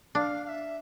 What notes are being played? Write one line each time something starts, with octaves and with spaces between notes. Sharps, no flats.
D4 F5
F5
E5